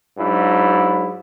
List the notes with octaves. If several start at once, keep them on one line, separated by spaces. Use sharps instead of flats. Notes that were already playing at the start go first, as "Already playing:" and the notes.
G#2 F#3 D4 E4